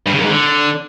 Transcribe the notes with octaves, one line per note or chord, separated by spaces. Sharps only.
G2
C#3
F#2
G#2
D3